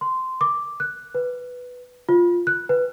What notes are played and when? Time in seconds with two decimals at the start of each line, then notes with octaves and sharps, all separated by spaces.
0.01 C6
0.41 D6
0.80 F#6
1.15 B4
2.09 F4
2.47 F#6
2.69 B4